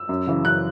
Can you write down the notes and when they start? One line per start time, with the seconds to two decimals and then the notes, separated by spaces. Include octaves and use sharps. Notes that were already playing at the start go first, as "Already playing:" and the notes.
Already playing: E6
0.09 F#2
0.27 C#3 E3
0.44 F#2 F#6